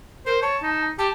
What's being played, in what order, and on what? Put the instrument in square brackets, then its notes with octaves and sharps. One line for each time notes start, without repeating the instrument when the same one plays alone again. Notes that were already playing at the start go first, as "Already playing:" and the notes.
[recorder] A#4 [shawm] C5
[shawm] C#5 [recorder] A5
[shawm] D#4
[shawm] G4 [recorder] A5